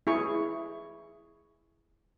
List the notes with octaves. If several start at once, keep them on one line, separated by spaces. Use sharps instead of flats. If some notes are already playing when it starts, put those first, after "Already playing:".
E4 G#4 C#6